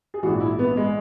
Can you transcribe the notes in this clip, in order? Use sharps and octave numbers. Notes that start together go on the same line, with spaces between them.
G#4
A#1 G#2 E3 F#4
E4
B3
G#3